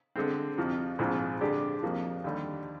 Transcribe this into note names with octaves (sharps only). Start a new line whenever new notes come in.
D3 G#3 C4
F2 C3 F3
A#1 G#2 F3 C4
D3 G#3 D4 G4
F2 C3 F3 A#3
D#2 D3 G3